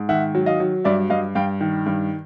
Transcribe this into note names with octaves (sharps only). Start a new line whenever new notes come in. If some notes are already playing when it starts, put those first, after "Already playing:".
Already playing: G#2
D#3 E5 F#5
F#3
D#5 F5
F#3
G2 D5 E5
G2 D#5 F5
G2 F5 G5
D#3
G2